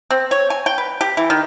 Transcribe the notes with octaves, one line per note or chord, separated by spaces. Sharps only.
C4
C#5
G#5
G5
B4
G4
E3
D#3